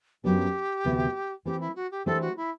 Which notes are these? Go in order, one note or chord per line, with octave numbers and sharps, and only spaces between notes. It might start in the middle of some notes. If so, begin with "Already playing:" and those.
F#2 F#3 B3 D4 G4
D2 C3 E3 B3 F#4
E3 A3 C4 G4
E4
F#4
G4
E3 A3 D4 G4 A4 C5
F#4
E4